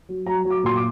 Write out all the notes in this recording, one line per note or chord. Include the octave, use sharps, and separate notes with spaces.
F#3
F#3 A#5
F#3
D6
A#2 C6
D6